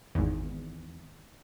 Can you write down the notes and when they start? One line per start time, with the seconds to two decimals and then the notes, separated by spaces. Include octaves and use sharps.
0.15 G#1 E2